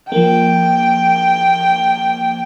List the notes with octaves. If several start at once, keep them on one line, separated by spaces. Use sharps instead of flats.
F3 A#3 G5